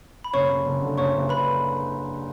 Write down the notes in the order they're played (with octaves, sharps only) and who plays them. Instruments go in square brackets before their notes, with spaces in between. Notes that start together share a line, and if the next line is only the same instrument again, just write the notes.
[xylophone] B5
[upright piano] F#1 [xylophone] C#5 C#6
[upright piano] F#1
F#1
D3
[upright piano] F#1 [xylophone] C#5 C#6
[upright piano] F#1
[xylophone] B4 B5